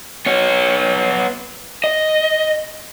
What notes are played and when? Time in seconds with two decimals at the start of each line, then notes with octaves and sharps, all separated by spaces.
0.26 B3 C#5
1.84 D#5